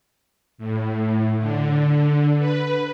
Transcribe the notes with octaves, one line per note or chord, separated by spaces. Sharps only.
A2
D3
B4